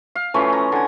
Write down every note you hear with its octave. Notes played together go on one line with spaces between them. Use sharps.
F5
E3 F3 A3 C#4
A#5
D3 G#5